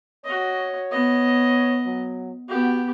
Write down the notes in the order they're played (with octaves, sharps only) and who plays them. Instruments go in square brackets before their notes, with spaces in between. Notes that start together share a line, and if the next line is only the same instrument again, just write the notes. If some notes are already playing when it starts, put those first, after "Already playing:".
[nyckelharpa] F#4 D#5 [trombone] C#5
[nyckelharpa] B3 D#5
[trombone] F#3
[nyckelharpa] B3 G4 [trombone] F#4